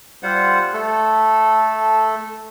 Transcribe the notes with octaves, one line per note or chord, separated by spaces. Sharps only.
G3 F4 C5 F#5
A3 A4